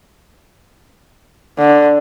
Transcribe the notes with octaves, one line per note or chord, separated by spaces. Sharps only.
D3